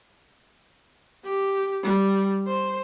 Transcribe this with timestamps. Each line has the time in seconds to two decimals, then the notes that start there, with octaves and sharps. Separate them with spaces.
1.25 G4
1.84 G3
2.48 C5